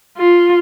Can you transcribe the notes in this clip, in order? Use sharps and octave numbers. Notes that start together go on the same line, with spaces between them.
F4